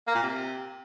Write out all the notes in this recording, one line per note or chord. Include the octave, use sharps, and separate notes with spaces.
A#3
A#2
C3